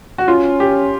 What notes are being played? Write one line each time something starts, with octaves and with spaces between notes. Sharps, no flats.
F#4
C#4 F4
G4